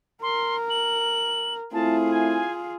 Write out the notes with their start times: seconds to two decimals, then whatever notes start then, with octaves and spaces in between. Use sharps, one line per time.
0.22 A#4 C6
0.70 F#7
1.73 A3 C4 E4 F4 G#4 A5
2.11 G#5